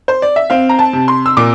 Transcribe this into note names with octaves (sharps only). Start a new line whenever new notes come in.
C5
D5
E5
C4 F5
A#5
A5
C3
C6
E6
A#2 D6